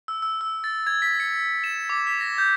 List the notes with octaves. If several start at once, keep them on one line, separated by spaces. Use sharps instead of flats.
E6
E6
E6
A6
G#6
B6
C#7
E7
D6
B6
A#6
G6